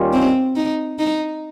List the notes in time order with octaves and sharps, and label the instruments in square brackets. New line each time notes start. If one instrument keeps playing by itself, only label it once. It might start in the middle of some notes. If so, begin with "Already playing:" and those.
Already playing: [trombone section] D#2 D#3 G3 C#4 F4
[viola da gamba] C4
D#4
D#4